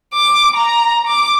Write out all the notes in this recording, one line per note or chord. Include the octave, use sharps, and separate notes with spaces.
D6
A#5
D6